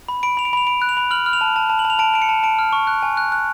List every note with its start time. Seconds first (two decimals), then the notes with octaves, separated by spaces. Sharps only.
0.09 B5
0.23 B5 D7
0.37 B5 F7
0.45 D7
0.53 B5 F7
0.67 B5 D7
0.82 F#6
0.89 F7
0.97 B5
1.11 F6 F#7
1.26 F6
1.33 F7
1.41 A5
1.56 A5
1.70 A5
1.79 F#7
1.85 A5
1.90 F7
1.99 A5 D7
2.14 A5 D7
2.22 C#7
2.29 A5
2.43 A5 D7
2.59 F6
2.73 C#6
2.87 F#6
3.03 G#5
3.17 F#6
3.32 F#6